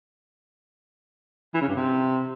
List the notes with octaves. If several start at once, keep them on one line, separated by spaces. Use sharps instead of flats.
E3
C#3
G2
C3